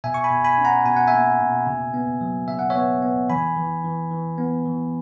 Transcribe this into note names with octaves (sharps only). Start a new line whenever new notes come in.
B2 E5 G#5
C#6
G#5 B5
B2
G#5 B5
C#4
F#5 A#5
B2 G#5
F#5
A#3 E5 G#5
B2
C#3
B3
F#3
C#3 E5
F#5
C#5 E5
B3
B3
E3 G#5 B5
E3
E3
E3
B3
E3